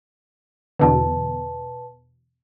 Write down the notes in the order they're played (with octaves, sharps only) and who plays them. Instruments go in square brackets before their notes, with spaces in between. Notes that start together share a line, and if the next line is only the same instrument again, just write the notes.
[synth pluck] E2 B2 D3 [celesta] B4 A5